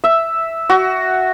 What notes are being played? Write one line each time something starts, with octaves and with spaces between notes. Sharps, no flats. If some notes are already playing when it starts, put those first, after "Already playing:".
E5
F#4